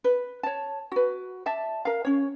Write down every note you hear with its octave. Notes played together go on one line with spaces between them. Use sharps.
B4
C#5 A5
F#4 B4
D5 E5 A5
A#4 F5
C#4 C#5